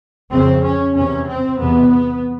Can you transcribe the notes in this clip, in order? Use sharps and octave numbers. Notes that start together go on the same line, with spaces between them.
F2 C#3 C4
C#4
E2 C#4
C3
C4
E2 C3 B3